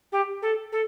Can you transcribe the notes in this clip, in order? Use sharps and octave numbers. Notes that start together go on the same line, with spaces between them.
G4
A4
A4